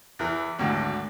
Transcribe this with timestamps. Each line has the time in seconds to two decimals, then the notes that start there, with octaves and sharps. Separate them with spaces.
0.19 E2 E3
0.59 G#1 D2 D3